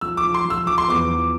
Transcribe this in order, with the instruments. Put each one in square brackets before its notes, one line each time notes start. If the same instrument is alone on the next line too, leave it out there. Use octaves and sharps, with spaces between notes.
[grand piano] F3 [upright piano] E6
[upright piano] D6
[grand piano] F3
[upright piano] C6
[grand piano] F3
[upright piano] E6
[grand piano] F3 [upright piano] D6
[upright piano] C6
[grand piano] E2 [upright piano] D6
[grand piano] F3